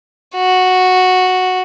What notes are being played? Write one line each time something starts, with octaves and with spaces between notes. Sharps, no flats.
F#4